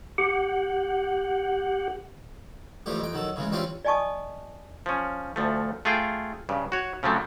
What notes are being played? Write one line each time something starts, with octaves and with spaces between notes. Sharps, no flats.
G4 F#5
E3 F3 G3 A3 G4
F2 G5
D#3 F#3 A4
C#3 E3 G#3
E3 G3 C4 C#4 F4 G4
D5 D#5 G#5 A5 C#6 D#6
F3 C#4
D2 F3 A3
A3 F4 G#4 F5 G5
G2 C#3
F#4 C#5
C#3 F3 F#3 A3 C4